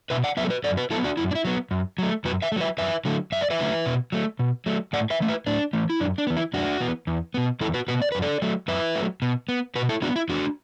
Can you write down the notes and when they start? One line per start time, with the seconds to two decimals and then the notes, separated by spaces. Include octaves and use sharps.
0.10 B2 B4 E5
0.24 D5 F#5
0.37 F#3 B3 B4 E5
0.45 A4
0.50 F#4 B4
0.64 F#2 A4 D5
0.77 F#4 B4
0.91 F#3 B3 E4 A4
1.04 D4 F#4
1.17 F#2 E4
1.31 D4
1.35 E4
1.45 F#3 B3
1.71 F#2
1.98 F#3 A3
2.25 F#2 F#4 B4
2.42 B4 E5
2.52 A3
2.56 F#3 B4 E5
2.78 F#2 B4 E5
3.05 D3 F#3 A3
3.32 F#2 E5
3.41 D5
3.50 B4 E5
3.59 D3 F#3 A3
3.86 B2
4.12 F#3 A3
4.39 B2
4.66 F#3 A3
4.93 A2 D5 F#5
5.10 B4 E5
5.20 E3 A3
5.28 B4 E5
5.47 A2 D4
5.73 E3 A3
5.90 E4
6.00 F#2 D4
6.18 D4
6.27 E3 B3
6.37 E4
6.54 F#2 D4 F#4
6.80 E3 B3
7.07 E2
7.34 B2 B3
7.61 E2 E4 A4
7.74 F#4 B4
7.88 B2 B3 F#4 B4
8.02 D5
8.12 F#2 B4
8.22 A4 D5
8.42 F#3 A3
8.68 F#2 B4 E5
8.95 F#3 A3
9.22 B2
9.49 B3
9.76 B2 F#4 B4
9.89 E4 A4
10.02 B3 D4 F#4
10.16 E4
10.29 E2 D4 F#4